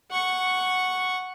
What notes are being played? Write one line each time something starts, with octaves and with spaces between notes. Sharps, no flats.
F#5 C#6